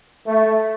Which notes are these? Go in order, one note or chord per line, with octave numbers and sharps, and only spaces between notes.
A3